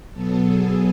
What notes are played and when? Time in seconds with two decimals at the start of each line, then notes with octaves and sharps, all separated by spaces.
0.13 B2 F#3 B3 A4
0.44 G#4